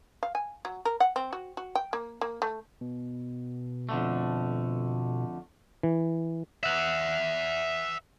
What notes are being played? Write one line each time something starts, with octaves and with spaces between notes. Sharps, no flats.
F5
G#5
F#3
A#4
F#5
C4
F#4
F#4
G5
A#3
A#3
A3
B2
F2 D3 A3
E3
E5 F#5